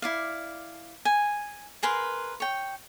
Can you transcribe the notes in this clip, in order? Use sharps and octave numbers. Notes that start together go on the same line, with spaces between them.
E4 D5 F5
G#5
G#4 A#4 B4 C6
C#5 G5